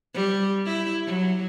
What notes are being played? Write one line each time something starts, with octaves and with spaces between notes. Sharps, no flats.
G3
E4
F#3